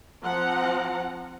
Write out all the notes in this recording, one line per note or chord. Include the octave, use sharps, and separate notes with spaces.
F3 C4 F#5 A#5